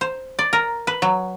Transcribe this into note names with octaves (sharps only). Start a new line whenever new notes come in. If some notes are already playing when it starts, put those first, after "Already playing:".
C5
D5
A#4
B4
F#3